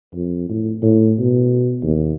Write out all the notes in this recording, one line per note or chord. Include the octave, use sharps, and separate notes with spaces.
F2
A2
A2
B2
D#2